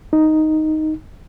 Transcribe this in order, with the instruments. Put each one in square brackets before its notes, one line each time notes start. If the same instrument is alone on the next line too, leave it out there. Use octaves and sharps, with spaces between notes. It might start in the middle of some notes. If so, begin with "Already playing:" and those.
[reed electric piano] D#4